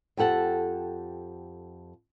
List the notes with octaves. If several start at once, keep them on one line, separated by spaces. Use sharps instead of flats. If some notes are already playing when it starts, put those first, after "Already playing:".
F2 G4 A4 F#5 A5